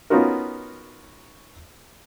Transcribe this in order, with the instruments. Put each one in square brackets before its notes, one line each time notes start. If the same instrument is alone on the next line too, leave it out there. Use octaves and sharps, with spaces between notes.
[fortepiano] B3 C#4 D#4 F4 F#4 A#4